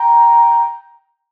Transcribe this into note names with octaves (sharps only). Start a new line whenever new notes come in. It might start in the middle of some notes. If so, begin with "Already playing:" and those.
Already playing: G5 A#5